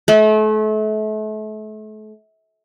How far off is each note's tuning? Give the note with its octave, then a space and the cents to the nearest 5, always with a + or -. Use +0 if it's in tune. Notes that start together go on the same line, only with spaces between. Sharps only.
A3 -35